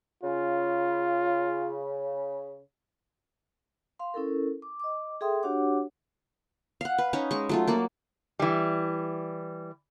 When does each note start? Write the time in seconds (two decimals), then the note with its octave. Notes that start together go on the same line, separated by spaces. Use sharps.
0.23 C#3 F4
3.99 F5 C6
4.14 C#4 E4 A4 A#4
4.62 D6
4.80 D#5 D6
5.21 G#4 A4 E5 G5 C6 D#6
5.43 D4 F#4 G4 C#5 F#5 D6
6.81 F5 F#5
6.98 B4
7.13 C#4 D#4 C#5
7.31 G#3 C#6
7.49 F#3 A3 F4
7.67 A#3 F#4 D5
8.39 E3 G3